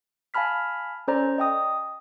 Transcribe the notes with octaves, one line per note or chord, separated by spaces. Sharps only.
F5 G#5 A5 B5 F6 B6
C#4 A4 C5 D5 A#5
D#5 G5 D#6